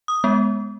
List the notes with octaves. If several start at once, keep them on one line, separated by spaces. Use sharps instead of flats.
D#6
G#3 B3